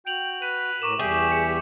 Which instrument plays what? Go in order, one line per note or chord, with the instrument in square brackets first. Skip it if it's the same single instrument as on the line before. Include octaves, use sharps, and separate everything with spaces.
[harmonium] F#4 [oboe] G5 [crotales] D7 F7 F#7
[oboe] B4 [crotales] D#7
[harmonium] A2 A#4 [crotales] C#6 D6 E7
[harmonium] E2 G3 E5 [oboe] G4 [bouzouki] G#4
[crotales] C#7